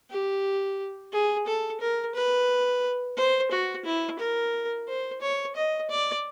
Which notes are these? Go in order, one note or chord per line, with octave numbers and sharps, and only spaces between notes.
G4
G#4
A4
A#4
B4
C5
F#4
E4
A#4
C5
C#5
D#5
D5